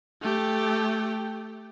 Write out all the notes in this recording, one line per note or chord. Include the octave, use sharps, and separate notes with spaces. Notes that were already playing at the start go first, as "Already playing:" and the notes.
A3 G4